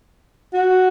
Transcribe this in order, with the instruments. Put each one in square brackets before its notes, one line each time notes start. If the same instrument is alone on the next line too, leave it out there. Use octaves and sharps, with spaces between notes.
[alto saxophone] F#4